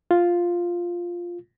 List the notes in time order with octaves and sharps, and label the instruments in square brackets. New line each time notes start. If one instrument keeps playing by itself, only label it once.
[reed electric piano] F4